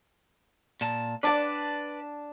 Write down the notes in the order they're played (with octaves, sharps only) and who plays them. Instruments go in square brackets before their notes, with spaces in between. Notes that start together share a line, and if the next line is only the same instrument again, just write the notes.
[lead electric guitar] A#2 A5
[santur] D4 A5 [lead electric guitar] B4 D5